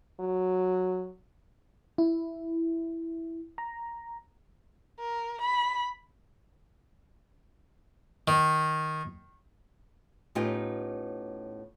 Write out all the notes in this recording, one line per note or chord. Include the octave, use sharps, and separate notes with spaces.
F#3
E4
A#5
A#4
B5
D#3
A2 B3 C#4 D#4 F4 G4